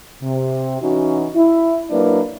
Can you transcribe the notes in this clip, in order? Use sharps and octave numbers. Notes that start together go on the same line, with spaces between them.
C3
E3 C#4 D#4 F#4
E4
F#3 A#3 D4 E4 B4 D5